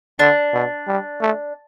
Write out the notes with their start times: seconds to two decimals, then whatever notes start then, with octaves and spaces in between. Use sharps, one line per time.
0.19 D3 D4
0.53 B2
0.87 G3
1.21 A3